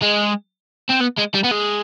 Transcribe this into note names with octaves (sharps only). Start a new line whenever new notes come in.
G#3
C4
B3
G#3
G3
B3
G#3